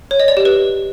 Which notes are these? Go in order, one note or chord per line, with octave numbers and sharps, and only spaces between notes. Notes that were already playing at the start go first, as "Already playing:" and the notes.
C#5
D#5
D5
G4
B4